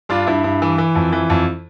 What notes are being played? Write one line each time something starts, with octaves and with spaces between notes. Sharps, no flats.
G2 D4 F4
G2 E4
G2
E3
E3
F2
E3
F2